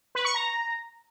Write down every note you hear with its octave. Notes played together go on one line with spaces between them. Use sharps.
B4
C#6
A#5